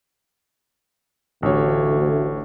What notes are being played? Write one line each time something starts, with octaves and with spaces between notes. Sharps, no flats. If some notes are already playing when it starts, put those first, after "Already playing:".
A1 D2 C#5